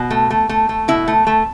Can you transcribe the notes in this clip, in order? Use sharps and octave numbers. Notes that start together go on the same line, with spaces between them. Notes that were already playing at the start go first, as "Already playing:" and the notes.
Already playing: B2
A3
A3
A3
A3
B2 E4
A3
A3